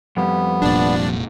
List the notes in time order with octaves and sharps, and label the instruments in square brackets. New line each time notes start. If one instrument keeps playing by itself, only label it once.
[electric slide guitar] F2 G3 [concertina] B3
[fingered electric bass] F1 A#2 [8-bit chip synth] D4 D5